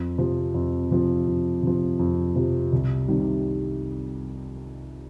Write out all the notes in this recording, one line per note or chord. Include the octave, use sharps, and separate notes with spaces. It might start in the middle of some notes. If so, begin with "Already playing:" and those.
Already playing: F2
C3 F3
F2
C3 F3
F2
C3 F3
F2
C3 F3
C2
C3 D#3 G3